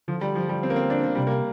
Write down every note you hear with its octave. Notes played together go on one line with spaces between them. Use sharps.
D3 F3
G3
F3
G3
C4
A#3
C4
D4
A#3
C3 G3
A#3